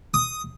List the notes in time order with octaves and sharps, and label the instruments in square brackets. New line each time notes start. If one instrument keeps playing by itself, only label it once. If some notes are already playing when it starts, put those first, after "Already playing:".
[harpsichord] D#6